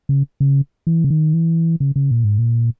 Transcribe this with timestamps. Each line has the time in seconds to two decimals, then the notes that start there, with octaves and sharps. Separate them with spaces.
0.09 C#3
0.40 C#3
0.87 E3
1.04 C#3
1.10 D#3
1.34 E3
1.80 C#3
1.96 C#3
2.11 A#2
2.24 G#2
2.38 A#2